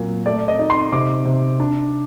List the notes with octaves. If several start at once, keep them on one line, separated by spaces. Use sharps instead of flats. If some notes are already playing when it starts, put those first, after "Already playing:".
Already playing: A#2 F#3
A3 D5
D#5
D#4
C6
C3 D6
C3
D4